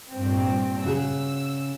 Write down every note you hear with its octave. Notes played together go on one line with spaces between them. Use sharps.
G2 A#2 C4
C#3 F#4 G#4 E6